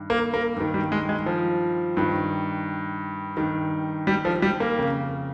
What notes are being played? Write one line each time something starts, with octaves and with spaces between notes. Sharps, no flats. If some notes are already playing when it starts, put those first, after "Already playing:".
Already playing: G2 D#3
A#3
A#3
G2 D#3
G3
G#3
G#3
F3
G2 D#3
G2 D#3
G3
F3
G3
A#3
F2 C#3